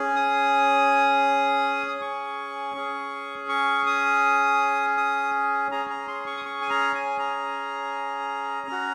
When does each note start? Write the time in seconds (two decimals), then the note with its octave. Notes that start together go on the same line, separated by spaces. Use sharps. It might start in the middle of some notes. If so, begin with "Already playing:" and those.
Already playing: C#4 G#4
0.16 D#6
1.88 D#6
2.01 C#6
2.75 C#4 G#4
3.49 C#6
3.86 D#6
4.97 D#6
5.71 C#4 G#4 A#5
5.90 A#5
6.08 C6
6.26 C#6
6.37 D#6
6.45 C#6
6.62 G#5
6.70 A#5
6.95 G#5
7.19 A#5
8.67 C#4 F#4